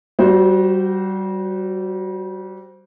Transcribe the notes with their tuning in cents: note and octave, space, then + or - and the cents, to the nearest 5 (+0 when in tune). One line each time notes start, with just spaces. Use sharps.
G3 -25 F#4 +0 C5 +0